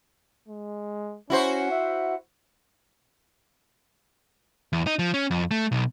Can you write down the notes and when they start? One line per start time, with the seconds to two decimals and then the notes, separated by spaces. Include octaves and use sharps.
0.48 G#3
1.30 C#4 E4 F#4 C5
1.71 E5
4.73 E2
4.87 D#4
4.99 F3
5.14 C#4
5.31 F2
5.51 A3
5.72 B1